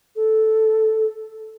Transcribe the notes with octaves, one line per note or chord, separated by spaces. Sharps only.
A4